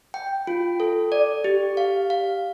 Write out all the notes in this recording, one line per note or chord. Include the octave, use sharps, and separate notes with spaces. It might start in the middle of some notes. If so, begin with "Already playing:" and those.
G5
F4
A4
D5
G4
F5
F5